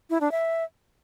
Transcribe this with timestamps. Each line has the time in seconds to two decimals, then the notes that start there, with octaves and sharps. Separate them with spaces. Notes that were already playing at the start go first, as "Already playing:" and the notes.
0.10 E4
0.21 D4
0.32 E5